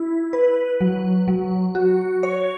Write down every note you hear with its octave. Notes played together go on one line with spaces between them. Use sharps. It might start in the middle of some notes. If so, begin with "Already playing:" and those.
Already playing: E4
B4
F#3
F#3
F#4
C#5